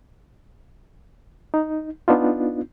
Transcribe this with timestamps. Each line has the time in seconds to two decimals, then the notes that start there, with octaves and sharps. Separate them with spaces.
1.54 D#4
2.08 B3 D4 D#4 F4